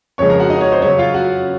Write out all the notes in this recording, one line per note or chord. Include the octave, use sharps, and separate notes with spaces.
F2 C#3 F3 G#3 C#5 C#6
A#4 A#5
F#4 F#5
D#4 D#5
C#5
C5
F#2 C#3 F#3 C#5
F4 F5
F#4 F#5